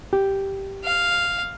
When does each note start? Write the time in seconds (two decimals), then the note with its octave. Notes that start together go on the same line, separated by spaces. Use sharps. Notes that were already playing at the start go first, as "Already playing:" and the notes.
0.13 G4
0.84 F5